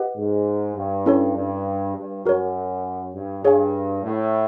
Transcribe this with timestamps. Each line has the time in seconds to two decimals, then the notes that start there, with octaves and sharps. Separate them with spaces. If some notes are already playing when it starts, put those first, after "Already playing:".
Already playing: G4 B4 D#5 F#5
0.16 G#2
0.76 G2
1.06 C#4 E4 A4 C#5
1.36 G2
1.96 G2
2.25 F#2 F#4 A#4 C#5
3.14 G2
3.44 G2 G#4 C#5 F5 G#5
4.03 A2